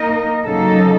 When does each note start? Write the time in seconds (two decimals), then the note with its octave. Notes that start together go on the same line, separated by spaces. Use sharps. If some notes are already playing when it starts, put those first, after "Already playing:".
Already playing: A#3 D#4 A#4 D#5
0.45 C#3 F#3 A#3 D#4 A4